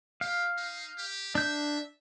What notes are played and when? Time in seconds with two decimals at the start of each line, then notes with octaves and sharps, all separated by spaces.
0.21 G4 F5
0.57 D#4
0.98 G4
1.35 D4 E5 G6